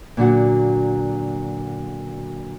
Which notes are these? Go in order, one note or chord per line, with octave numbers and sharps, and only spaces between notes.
A#2 D3 F#3 F#4